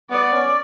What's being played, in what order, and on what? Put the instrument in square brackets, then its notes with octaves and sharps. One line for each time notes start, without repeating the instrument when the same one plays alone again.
[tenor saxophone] B3 [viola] D5
[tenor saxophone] C#4